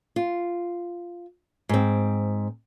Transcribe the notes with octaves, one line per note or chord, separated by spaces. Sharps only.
F4
G#2 C4